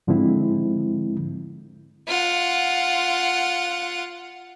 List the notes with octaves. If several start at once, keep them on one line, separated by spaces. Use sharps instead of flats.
G#2 D3 F3 G#3 C4 E4
F4 F#5